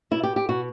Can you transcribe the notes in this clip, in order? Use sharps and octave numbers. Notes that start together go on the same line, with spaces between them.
B2 E4
G4
G4
B2 F#4